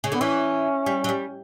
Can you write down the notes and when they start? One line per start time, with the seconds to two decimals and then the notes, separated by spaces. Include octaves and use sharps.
0.04 C#3
0.12 D3 B3
0.21 E3 C#4
0.86 G3
1.04 F#3
1.09 G3